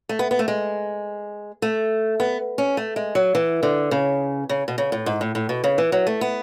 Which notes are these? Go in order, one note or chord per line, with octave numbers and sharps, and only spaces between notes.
A3
B3
B3
A3
G#3
A3
B3
C#4
A3
G#3
F#3
E3
D3
C#3
C#3
B2
C#3
A2
G#2
A2
A2
B2
C#3
E3
F#3
A3
B3